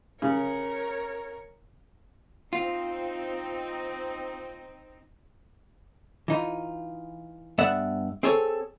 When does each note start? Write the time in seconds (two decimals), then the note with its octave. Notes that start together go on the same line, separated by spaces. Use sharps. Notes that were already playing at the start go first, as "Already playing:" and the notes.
0.22 C#3 A#4 C#5
2.53 C4 D#4 F4
6.28 E3 D#4 F4
7.58 G2 B3 D5 E5 F#5
8.23 C4 G#4 A4 C#5